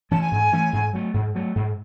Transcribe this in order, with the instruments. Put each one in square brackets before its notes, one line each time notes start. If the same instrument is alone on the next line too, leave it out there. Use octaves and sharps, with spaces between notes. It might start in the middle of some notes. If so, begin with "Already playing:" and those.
[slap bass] E3 A3 C#4 [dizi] A5
[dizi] G#5
[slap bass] G#2
E3 A3 C#4
G#2
F#3 A3
G#2
F#3 A3
G#2